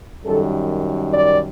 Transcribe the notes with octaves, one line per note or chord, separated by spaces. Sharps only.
F#2 D#3 G3 A4
D5